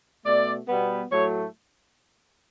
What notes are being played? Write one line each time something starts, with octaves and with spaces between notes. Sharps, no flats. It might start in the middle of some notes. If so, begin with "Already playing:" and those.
B2 A3 D5
B2 G3 B3
A2 F#3 A3 C#5